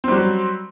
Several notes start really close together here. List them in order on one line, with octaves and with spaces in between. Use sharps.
C4 G3 F#3